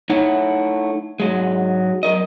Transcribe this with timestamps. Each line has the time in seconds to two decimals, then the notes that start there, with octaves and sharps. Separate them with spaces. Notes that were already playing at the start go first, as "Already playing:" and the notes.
0.10 A3 D#4 E4 C#5 F#5
1.20 G#2 F#3 G#3
2.03 F#2 A#4 D#5